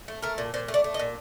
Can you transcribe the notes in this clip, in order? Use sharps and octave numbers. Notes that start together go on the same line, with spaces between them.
A3
A3 A#4
A#2
A#2 C5
A3
D5
A3
D#5
A#2